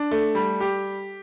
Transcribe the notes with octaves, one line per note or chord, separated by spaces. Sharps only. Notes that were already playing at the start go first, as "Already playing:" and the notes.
Already playing: D4
A3
G3
G4